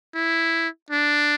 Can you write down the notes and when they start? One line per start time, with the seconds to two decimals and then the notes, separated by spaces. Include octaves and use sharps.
0.15 E4
0.91 D4